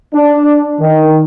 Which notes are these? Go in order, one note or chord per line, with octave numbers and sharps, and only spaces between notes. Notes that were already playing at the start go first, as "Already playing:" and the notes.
D4
D#3